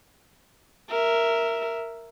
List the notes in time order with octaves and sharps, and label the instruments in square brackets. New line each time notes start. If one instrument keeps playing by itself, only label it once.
[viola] A#4 E5